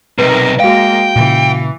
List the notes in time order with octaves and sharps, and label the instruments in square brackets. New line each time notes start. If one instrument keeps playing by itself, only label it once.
[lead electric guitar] B1 C3 [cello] D#3 A#4 [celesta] B4
[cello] G#3 A#3 [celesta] F#4 F5 [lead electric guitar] G5
[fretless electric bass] A#2 C#3 [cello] E3